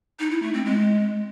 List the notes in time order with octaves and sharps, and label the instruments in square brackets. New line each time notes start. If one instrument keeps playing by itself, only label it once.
[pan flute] D#4
E4
A3
C4
G#3